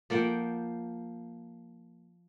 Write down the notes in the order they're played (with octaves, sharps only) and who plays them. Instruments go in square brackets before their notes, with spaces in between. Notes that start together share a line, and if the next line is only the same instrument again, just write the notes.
[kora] F3 A#3 F#5 G5